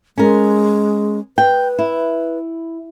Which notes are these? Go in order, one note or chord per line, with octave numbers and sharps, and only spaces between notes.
G#3 C#4 A#4
B4 G5
E4